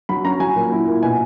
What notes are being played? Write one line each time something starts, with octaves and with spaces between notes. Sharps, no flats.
F#3 B5
C#4 A#5
F#3 G#5
A#2
E4
A#2
B2 G#5